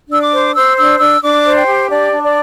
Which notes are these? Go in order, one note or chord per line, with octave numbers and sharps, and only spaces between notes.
D4 E6
D6
C5
C5 E6
D4 E6
D4 E6
D4 D6
C5
G5
G4
D4 D5
D4
D5